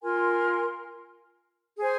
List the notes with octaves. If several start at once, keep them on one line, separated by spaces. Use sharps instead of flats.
F4 A#4 G#5 C6
G#4 C5 G#5